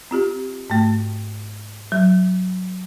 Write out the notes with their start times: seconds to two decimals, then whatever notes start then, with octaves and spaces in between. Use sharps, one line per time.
0.11 C4 F4 G4
0.70 G#2 A3
1.92 F#3